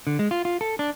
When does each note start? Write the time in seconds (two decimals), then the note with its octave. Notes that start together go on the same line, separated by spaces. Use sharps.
0.07 D3
0.19 G#3
0.31 F4
0.45 F4
0.61 A4
0.79 D4